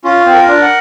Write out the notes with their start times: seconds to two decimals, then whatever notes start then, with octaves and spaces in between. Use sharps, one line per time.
0.04 C#4 F4
0.26 C4
0.34 A#4
0.48 D4
0.62 F#5